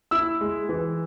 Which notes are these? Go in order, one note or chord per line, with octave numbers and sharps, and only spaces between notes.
E4 E6
G#3
E3